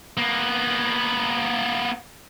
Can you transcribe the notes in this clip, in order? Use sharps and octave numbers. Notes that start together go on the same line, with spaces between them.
A#3 B3